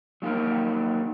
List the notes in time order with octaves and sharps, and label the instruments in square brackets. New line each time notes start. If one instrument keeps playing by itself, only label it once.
[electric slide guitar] F#3 A#3 D#4 A#4